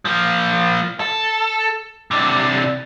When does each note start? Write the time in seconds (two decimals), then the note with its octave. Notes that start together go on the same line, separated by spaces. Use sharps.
0.05 F3 A#3
1.00 A4
2.11 C3 D4